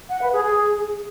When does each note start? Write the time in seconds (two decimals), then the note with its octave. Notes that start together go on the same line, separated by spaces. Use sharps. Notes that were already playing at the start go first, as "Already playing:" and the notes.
0.09 F#5
0.21 B4
0.32 G#4
0.44 G#4